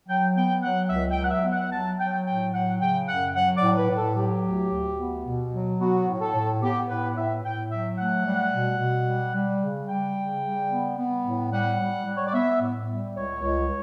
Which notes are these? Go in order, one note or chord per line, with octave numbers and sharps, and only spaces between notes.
F#3 G5
B3 G5
F#3 F#5
C#2 E5
G5
F#3
F#5
E5
B3
F#5
F#3 A5
F#3 G5
A2 G5
F#3 F#5
C#3 G5
F#2 F#5
F#3 F#5
D5
A2
B4
A2
A4
F#3 G4
D2
D2
B3
B2
F#3
B3 F#4
A2
A4
A2
B3 G4
A2 B4
F#5
A2 E5
A2 G5
F#3 E5
A3 F#5
G3
B2
B2
G3
G3
C#3
G3 G5
C#3
G3
B3
B3
A2
G3 F#5
G3
G3
C#5
D5
B3 E5
A2
G3
C#2 C#5
C#2